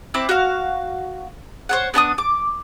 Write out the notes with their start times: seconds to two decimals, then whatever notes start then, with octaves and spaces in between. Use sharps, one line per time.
0.14 C4 E4 D6 F#6
0.29 F#4 F5
1.69 C5 C#5 F#5
1.94 B3 D4 A5 D#6
2.18 D6